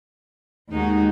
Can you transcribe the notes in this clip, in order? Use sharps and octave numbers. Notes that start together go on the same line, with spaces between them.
D#2 D#3 G#3 D#4 F#4